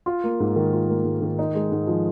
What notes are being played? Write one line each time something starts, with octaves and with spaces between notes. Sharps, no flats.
F4
A#3
G#2
D#3
F4
A#3
G#2
D#3
D#4
G#3
G#2
F3